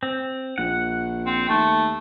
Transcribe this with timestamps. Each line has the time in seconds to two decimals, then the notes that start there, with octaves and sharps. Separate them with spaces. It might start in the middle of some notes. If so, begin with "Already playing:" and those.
0.03 C4
0.58 A#1 F#5
1.26 C4
1.49 D#2 A3